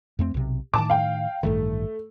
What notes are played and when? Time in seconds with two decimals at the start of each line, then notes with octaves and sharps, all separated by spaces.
0.19 F2 A3 C4
0.34 B1 C3
0.74 A2 D#3 A5 D6
0.90 F5 G5
1.43 A1 G2 D#3 A3